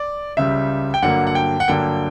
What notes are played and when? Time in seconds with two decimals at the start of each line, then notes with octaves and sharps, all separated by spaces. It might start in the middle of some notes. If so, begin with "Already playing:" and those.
Already playing: D5
0.37 C#2 C#3 G3 E5
0.94 G5
1.02 G2 D3 F#3 A#3 F#5
1.27 F#5
1.35 G5
1.60 F#5
1.68 G2 D3 F#3 A#3 G5